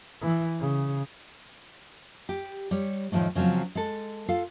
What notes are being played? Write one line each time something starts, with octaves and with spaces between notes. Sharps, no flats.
E3
C#3
G4
G3 C#5
A2 D#3 F3 G#3 A3
C#3 F3 F#3 G#3 C4
G#3 A4
F4 A4 F5